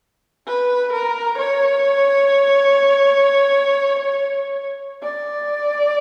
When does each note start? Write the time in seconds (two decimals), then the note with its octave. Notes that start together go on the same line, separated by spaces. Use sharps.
0.47 B4
0.93 A#4
1.38 C#5
5.03 D5